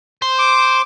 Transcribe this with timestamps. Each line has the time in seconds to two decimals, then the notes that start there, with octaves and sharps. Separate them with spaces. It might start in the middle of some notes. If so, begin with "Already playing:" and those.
0.22 C5
0.39 D6